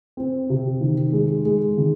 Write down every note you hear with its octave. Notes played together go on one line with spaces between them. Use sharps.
C4
C3
D#3
G#3
G#3
D#3